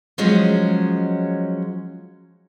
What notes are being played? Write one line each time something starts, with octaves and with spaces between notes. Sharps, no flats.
F3 F#3 G#3 C#4